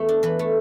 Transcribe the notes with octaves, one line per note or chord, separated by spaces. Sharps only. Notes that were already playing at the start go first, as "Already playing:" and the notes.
Already playing: E2 A3 B3
D4
E3 B4
A3